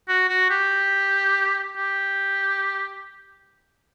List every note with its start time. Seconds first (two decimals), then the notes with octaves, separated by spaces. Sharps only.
0.09 F#4
0.29 F#4
0.50 G4
1.77 G4